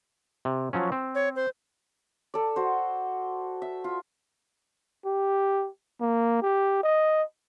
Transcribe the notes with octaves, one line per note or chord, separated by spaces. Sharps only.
C3
F3 F#3 C#4
C4
C#5
C5
A4 D5
F#4 C5
E5
F4
G4
A#3
G4
D#5